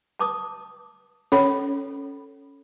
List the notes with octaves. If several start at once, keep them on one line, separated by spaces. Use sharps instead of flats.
A5 D6 D#6
C#4 A4 C#5 B5